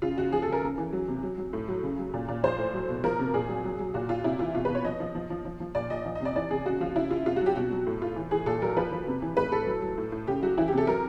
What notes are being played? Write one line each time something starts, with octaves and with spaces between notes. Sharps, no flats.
C#3 F4
C#3 F#4
F3 G#4
A4
C#3 A#4
C#3
E3
F#3
C3
F#3
F#3
A2
F#3
C#3
F#3
A#2
A#2
F3 C5
A2
F#3
B2
F3 A#4
C3
A#2 G#4
F#3
F#3
F#3
A#2 F#4
A#2 F4
C3 E4
E3 F4
B2 F4
B4
B2
C#5
F3 D#5
F3
F3
F3
F3
F3
A#2 D5
A#2 D#5
F3
D#5
C3 D5
E3 D5
C3 G#4
C#3 F#4
F3 F4
C#3 E4
C#3 F4
C3 F4
F#4
F#3
G4
B2 F#4
F#3
A2
A2 F4
E3
E3 G#4
A#2 A4
F#3 A#4
F3 B4
F3
C3
E3
A2 B4
A2 A4
F#3
F#3
A2
A2
C#3 G4
F#3 F#4
E3 E4
G4
C3 A4
F#3 A#4